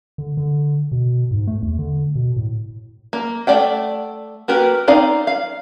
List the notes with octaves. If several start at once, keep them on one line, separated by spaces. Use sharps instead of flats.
D3
D3
B2
G#2
A3
E2
D3
B2
A2
A#3
A3 D5 F#5 G5
A#3 F#4 G4 A#4 B4
C4 D#4 D5 F5
F5